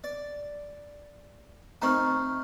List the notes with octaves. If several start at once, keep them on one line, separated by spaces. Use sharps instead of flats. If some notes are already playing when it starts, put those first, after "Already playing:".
D5
D#3 A3 C4 A#5 C#6 F6